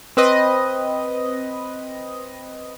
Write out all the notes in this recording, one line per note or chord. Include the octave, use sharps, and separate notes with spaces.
C4 B4 D#5